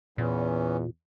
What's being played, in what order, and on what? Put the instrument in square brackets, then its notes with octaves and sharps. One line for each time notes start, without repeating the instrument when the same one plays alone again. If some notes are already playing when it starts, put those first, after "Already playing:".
[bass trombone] E2 [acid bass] A#2 [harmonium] E3 B3 C#4